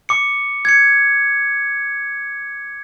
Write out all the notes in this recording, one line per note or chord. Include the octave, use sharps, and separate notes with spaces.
D6 C#7
G#6 C#7